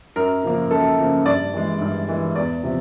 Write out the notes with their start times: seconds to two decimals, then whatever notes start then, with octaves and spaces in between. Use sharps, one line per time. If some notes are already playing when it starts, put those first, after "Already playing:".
0.16 F#2 A#4
0.43 C#3 F3 A#3
0.71 F#2 A4
0.99 C#3 F3 A#3
1.26 G2 D5
1.53 E3 G#3
1.81 G2
2.09 E3 G#3
2.36 E2 D5
2.63 C3 F3